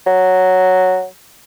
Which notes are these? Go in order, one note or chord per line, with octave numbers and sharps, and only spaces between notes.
F#3